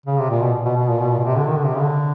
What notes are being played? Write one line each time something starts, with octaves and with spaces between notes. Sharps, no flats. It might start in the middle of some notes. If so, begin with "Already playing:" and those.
C#3
C3
A#2
B2
B2
B2
A#2
B2
A#2
B2
C3
D3
D#3
D3
C3
C#3
D3